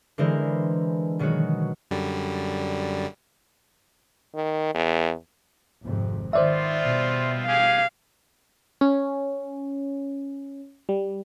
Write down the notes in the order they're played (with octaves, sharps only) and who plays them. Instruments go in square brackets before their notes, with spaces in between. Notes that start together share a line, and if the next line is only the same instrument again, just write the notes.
[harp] D3 E3 G#3 E4 A#4 C5
B2 D#3 F#3 G#3 F#4
[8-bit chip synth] F#2 D3 G3
[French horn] D#3
E2
[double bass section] G#1 F2 C3
[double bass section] D#3 [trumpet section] B3 C4 F4 [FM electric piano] C5 D5 E5
[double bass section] B2 G3
[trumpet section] G#3 G4 G#4 [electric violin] F5
[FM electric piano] C#4
G3